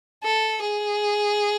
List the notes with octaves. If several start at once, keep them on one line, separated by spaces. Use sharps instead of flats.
A4
G#4